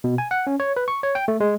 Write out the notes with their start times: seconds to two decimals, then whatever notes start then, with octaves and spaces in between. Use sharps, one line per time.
0.04 B2
0.18 G#5
0.31 F#5
0.47 C#4
0.60 C#5
0.77 B4
0.88 C#6
1.03 C#5
1.15 G5
1.28 A3
1.40 G#3